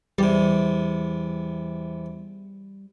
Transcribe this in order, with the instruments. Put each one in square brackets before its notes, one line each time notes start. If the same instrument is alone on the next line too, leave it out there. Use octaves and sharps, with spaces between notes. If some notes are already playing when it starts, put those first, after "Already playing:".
[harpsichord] E2 C3 [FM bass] G3